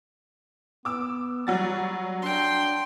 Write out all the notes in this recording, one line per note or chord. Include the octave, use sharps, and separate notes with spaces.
B3 D6 E6
F#3 G3 F#4 A6
D4 G5 C6